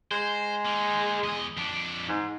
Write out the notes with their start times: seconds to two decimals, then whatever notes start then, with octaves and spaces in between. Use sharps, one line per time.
0.11 G#3 C5
0.65 A#3 D#4
1.23 E2 D#5
1.57 F2 D4
2.09 G#2